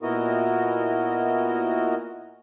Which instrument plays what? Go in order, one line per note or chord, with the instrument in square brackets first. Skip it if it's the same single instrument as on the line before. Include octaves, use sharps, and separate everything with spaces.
[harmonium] A#2 B3 E4 F#4 A#4 D#5